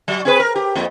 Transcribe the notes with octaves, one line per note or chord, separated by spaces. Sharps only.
F#3
C4 G#4 B4
A#4
G4
F2 A#3